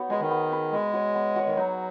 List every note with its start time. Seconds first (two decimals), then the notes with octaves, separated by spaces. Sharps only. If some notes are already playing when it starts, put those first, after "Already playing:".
Already playing: B3 D#4 F#4 C#5
0.10 G#3 G#4 B4
0.20 D#3
0.31 B3
0.52 G#4 B4
0.72 G#3 B3
0.93 F#4 C#5
1.15 B3
1.36 F#4 C#5
1.47 D#3
1.57 F#3 D#4